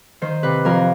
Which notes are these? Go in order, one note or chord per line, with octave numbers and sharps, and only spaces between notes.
D#3 C5
C3 B4
F2 A#4